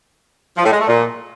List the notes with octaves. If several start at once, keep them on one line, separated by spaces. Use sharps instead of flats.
F3
A2
G#3
A3
A#2